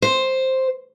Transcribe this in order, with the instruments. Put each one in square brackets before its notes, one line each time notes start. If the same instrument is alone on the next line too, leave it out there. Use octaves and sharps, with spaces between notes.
[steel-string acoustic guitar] C5